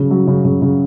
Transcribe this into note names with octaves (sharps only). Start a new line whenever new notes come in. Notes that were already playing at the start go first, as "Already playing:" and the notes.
Already playing: C#3 F#3
F#3
C#3
C#3
C#3